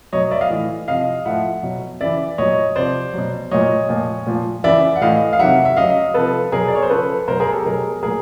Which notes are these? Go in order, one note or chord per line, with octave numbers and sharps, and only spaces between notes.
B2 F#3 C#5 D#5
D5 E5
D#5 F5
A2 E3
C3 F3 D#5 F5
A2 F3 E5 F#5
B2 F#3
C#3 E3 D5 E5
A#2 F#3 C#5 D#5
C3 F3 C5 D5
B2 F#3
A#2 F#3 C#5 D#5
A#2 F3
A#2 F3
C#3 E3 D5 E5
F#5
A2 E3 D#5 F5
F5
C3 D#3 F#3 E5 F#5
E5
C#3 F#3 D#5 F5
C3 F3 A4 B4
B2 F#3 G#4 A#4
D5
C#5
C5
C#3 F3 A4 B4
B2 F#3 A#4 C5
G#4 A#4
G4 A4
B2 F#3 G#4 A#4
A#2 F#3 G#4 A#4